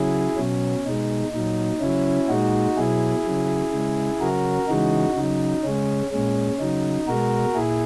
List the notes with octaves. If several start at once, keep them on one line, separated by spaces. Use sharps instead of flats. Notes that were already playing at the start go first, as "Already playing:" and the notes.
Already playing: C#3 F#3 E4 G#4
B2 F#3 C#4
B2 G#3 D#4
A#2 F#3 D#4
C#3 F#3 C#4 E4
A#2 G#3 D#4 F#4
B2 F#3 E4 G#4
C#3 F#3
C#3 G#3
C#3 F#3 F#4 A#4
C#3 E3 G#3 D#4 F#4
C#3 F#3 D#4
C#3 G#3 C#4
A#2 G#3 C#4
C#3 F#3 D#4
B2 G#3 F#4 A#4
A#2 E4 G#4